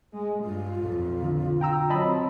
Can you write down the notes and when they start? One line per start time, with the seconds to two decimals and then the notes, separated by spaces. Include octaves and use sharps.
0.13 G#3
0.44 G2 F4
0.77 B1 F2
1.23 D3
1.61 G5 A#5 E6
1.90 F#3 C4 D#5 A5 B5